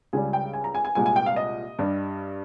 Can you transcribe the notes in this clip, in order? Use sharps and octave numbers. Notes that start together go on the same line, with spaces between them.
C#2 C#3 G3 G#5
G5
G#5
A#5
G#5
G#5
C2 A#2 G#3 G#5
G#5
G5
F5
D#5
G2 G3